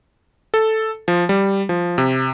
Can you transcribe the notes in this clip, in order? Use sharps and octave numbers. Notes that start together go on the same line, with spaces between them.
A4
F3
G3
F3
C3